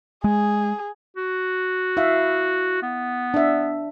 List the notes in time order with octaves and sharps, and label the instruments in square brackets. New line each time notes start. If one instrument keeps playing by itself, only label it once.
[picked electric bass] G#3 [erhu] G#4
[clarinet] F#4
[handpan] E4 E5 F5
[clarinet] B3
[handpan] D4 E5